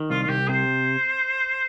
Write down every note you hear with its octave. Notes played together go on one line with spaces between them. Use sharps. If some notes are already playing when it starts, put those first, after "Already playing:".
Already playing: D#3
C2 F4
F4
C2 G4
C3 C5